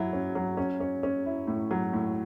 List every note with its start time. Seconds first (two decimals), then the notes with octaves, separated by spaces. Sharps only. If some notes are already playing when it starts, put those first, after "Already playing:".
Already playing: F#3 E4
0.13 C#4
0.35 F#3
0.57 C#4
0.80 C#4
1.03 C#4
1.26 E4
1.47 A2
1.71 F#3
1.93 A2